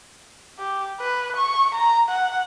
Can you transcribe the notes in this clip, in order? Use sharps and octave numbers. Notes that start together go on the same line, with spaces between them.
G4
B4
C#6
A#5
F#5